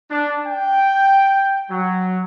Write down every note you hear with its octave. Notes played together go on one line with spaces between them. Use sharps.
D4
G5
F#3